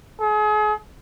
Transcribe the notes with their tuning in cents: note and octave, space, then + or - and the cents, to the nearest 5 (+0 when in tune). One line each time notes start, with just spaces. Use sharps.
G#4 +35